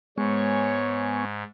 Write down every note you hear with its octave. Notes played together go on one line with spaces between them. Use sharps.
G#2 G#3 B3 C#5 G#5 C#6